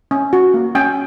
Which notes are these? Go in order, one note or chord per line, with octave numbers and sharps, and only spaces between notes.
C#4
F#4
A#3
C#4 G5